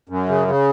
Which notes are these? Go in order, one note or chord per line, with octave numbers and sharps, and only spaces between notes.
F#2
C#3
C#3